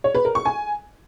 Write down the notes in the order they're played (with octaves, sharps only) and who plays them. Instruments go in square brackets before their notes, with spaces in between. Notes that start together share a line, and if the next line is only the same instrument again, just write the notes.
[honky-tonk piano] C#5
B4
A#4
C#6
G#5